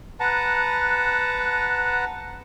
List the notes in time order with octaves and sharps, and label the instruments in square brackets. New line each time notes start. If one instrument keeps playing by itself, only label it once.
[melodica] B4 F#5 A5 A#5